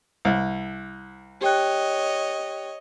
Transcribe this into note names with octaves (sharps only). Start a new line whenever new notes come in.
C2
G4 C#5 D#5 G5 F#6